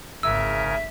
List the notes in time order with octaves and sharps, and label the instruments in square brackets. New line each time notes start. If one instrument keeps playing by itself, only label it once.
[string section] G#1 [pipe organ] C#3 A#4 G#5 [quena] E5 [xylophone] E6